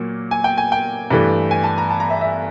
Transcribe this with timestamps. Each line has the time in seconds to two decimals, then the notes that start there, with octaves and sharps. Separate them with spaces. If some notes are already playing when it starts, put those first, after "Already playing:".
Already playing: A#2 F#3 A#3
0.31 G#5
0.44 G5
0.58 G#5
0.72 G5
1.11 G2 E3 A3
1.51 G#5
1.64 A5
1.78 A#5
1.90 A5
2.00 A#5
2.10 E5
2.21 E5